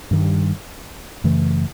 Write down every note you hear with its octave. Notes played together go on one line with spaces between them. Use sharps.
G2 D#3 G3
F#2 C#3 E3 A3